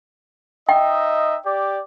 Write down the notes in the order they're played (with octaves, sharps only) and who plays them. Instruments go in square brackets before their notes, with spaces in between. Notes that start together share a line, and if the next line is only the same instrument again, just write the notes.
[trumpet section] D#4 D#5 E5 [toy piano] G5
[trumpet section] G4 D5